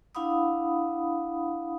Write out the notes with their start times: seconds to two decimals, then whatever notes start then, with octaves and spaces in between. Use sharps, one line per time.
0.15 D4 E4 F5 F#5 B5 D#6